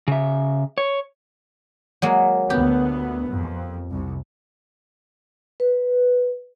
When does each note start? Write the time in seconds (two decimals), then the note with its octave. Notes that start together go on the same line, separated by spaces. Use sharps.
0.08 C#3 E5
0.78 C#5
2.02 F#3 G#3 A#3
2.50 D2 B3 G4
3.30 F2
3.92 C2
5.60 B4